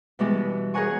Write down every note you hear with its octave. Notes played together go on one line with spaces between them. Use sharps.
B2 E3 G3 G#3 B3
G#4 A#4 C#5 F#5 G#5 C#6